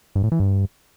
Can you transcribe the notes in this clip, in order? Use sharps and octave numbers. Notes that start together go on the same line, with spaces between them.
G2
A2
E3
G2